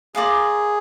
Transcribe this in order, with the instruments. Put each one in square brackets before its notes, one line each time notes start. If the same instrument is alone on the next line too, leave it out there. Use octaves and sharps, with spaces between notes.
[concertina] G#4 [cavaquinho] A#4 D5 F5 C6